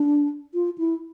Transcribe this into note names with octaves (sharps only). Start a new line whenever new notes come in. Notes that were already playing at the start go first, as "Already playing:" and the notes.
Already playing: D4
F4
E4